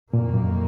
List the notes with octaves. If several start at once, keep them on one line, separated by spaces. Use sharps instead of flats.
F2 A#2 D#3 A#3
F#2